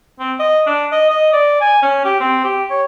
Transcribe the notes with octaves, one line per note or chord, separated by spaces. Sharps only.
C4
D#5
D4
D#5
D#5
D5
G#5
C#4
G4
C4
G4
C#5